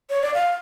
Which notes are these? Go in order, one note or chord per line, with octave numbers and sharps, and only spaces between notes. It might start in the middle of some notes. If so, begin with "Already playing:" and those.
C#5
D5
F5